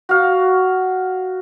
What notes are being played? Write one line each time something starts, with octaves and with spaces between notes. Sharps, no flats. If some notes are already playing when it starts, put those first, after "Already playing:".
F#4 F5